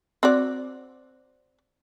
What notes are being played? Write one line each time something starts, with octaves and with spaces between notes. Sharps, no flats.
C4 F#4 D5